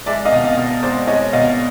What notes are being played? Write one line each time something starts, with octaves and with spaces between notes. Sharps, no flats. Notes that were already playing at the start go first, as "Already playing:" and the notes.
G#3 D5 E5
D#5 F5
B2
D#5 F5
B2
G#3 C5 D5
G#3 C#5 D#5
B2 D#5 F5